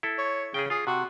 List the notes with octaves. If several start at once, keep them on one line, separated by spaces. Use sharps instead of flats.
E4 A4
C#5
C#3 G#4 G5
F4 G#4
C3 F#4